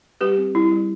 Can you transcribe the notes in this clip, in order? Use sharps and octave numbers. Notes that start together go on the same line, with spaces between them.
G3 G4 B4
C4
G3 E4
G3